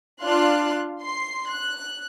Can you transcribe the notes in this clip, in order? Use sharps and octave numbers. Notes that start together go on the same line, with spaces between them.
D4 F4 F5 C6 F#6
C6 C7
F#6